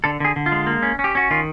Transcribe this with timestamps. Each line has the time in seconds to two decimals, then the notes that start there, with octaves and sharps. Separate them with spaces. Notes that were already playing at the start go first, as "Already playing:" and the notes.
0.04 D3 A4
0.20 D3 G#4
0.36 D3
0.46 F4
0.52 G#3
0.67 A#3
0.83 C#4
0.99 C#4
1.04 G4
1.15 C#4 F#4
1.31 D#3 F4